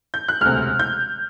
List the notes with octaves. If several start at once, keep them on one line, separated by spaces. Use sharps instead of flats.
G6
F#6
E1 D2 C3 F6
G6